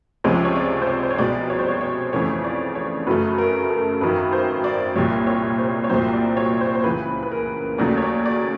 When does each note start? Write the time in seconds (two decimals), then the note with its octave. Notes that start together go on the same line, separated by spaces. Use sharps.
0.24 C#2 C3 F3 G#3 C#5
0.45 C#5
0.56 D5
0.82 C5
0.87 C#5
1.03 C5
1.11 C#5
1.18 C2 B2 G#3 D5
1.50 C#5
1.59 C5
1.68 C#5
1.81 C#5
2.13 F2 C#3 E3 A3 C#5
2.44 D5
2.75 C#5
3.07 F#2 C#3 F#3 A3 B4
3.38 A#4
3.70 A4
4.01 G#1 F#2 D#3 B4
4.33 C5
4.64 D5
4.96 C2 A#2 G3 C#5
5.27 C#5
5.58 C5
5.84 C#5
5.90 C2 A#2 F#3 C5
6.13 D5
6.37 C#5
6.61 C5
6.75 C5
6.84 C#2 C#3 E3 B4
7.23 B4
7.31 A#4
7.78 D#2 C#3 F#3 A3 D5
7.97 C#5
8.02 D5
8.26 D5